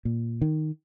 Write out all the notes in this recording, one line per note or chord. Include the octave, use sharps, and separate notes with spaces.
A#2
D#3